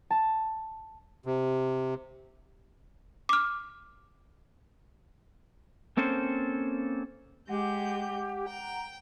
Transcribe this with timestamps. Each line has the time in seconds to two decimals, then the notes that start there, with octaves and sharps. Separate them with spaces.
0.10 A5
1.26 C3
3.29 D6 F6
5.97 A#3 C4 C#4 A4 C5
7.49 G#3 G4 F#5 G6
8.48 G5 A#5